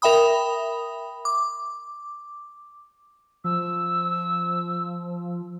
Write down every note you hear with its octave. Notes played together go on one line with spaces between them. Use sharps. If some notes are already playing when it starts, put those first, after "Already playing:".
A#4 E5 G5 B5 D#6
D6
F3 E6